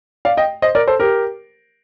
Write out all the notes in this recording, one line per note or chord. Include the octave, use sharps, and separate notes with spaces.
D5 F5
D#5 G5
C5 D#5
A#4 D5
A4 C5
G4 A#4